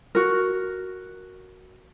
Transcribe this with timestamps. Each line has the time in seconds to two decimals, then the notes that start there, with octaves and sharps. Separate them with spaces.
0.15 F#4 A#4